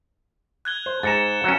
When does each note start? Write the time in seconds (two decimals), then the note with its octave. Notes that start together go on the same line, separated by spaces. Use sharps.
0.65 F#6 G#6 G7
0.86 C5
1.03 G#2 A#5 A6 C#7 E7
1.44 F#3 C#4